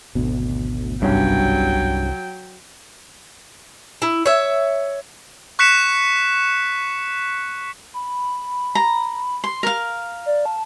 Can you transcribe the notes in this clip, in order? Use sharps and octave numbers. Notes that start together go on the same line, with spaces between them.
G#1 D2 B2
C2 G2 F#3 C#4 G5
E4
C#5 E5
C#6 F#6 B6 C#7 E7
B5
A#5
C6
A#4 F5
D5
A5